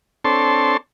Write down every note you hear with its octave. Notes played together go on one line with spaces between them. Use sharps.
C4 D4 A4 C#5 A5 C6